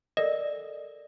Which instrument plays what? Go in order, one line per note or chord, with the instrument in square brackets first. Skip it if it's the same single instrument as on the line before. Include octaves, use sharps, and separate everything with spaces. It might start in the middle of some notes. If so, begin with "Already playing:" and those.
[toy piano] A4 A#4 D5 [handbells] D#5